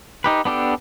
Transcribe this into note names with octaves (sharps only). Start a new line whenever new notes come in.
D#4 G4 B4
B3 D4 G4 A4